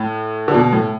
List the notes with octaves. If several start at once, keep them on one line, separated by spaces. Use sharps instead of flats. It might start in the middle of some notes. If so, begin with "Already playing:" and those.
Already playing: A2
D3
B2
A2